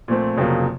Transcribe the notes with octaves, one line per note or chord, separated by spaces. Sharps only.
A#2 F3 A3 C4
F1 F2 C#3 F#3 A#3